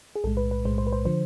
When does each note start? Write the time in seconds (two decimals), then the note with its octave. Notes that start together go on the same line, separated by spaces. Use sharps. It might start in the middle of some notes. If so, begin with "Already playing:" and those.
0.15 G#4
0.24 B1 A2 G#3 A4
0.37 B4
0.51 B4
0.65 B1 A2 G#3 C5
0.78 C5
0.87 B4
0.93 C5
1.05 D3 F3 C5